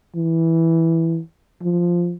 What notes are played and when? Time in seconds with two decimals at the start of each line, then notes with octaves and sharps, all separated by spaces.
0.16 E3
1.62 F3